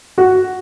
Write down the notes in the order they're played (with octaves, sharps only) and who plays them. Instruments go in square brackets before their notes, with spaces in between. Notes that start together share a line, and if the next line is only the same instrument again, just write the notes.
[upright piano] F#4